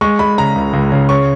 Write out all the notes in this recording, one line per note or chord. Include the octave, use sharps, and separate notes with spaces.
G#3 C#6
G#3 B5
C#3 A#5
C#2
C#2
C#3
C#4 C#6